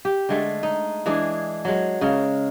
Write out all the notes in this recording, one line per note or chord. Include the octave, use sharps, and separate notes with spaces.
G4
D3 G#3 A3
D#4
E3 G#3 D4 G#4
F#3 G#3
C#3 G#3 A#4